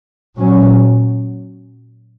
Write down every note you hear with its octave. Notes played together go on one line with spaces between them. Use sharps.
A#2 F#3 C#4